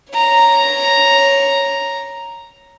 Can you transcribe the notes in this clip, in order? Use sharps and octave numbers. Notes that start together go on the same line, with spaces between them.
C#5 A#5